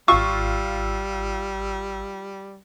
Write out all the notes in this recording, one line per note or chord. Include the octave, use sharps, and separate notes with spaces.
G#1 G3 F4 C#6 E6